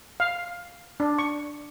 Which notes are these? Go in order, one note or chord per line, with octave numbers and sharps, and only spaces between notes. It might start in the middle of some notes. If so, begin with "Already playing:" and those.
F5
D4
C#6